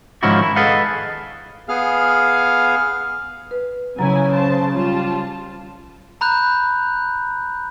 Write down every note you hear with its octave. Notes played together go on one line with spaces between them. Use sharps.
G#2 D#3 F3 C#4 E4 F#4
E4
G#4 A4 B4 D#5 F5 F#5
B3 G#4 F5 F6
B4
C#3 F#3 E4 G#5 A#5
C5 A5
G3 F4 A5
A#5 B5 F#6 G6